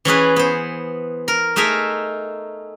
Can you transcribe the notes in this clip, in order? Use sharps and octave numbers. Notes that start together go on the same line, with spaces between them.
E3 C#4 G#4 B4
B3 C5
A#4
A3 D#4 G#4 A#4 E5